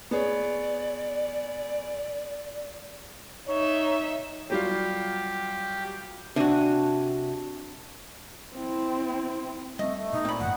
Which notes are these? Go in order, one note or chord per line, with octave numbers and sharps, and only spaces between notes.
B3 G#4 C#5 D5
D#4 C#5 E5
F#3 G3 F4 G4
C3 D4 F#4 G#5
C4 E4
G3 A3 C4 D#5
A3
B2 D#4
A#2 C4 B5
G1 F#2 A2 F#5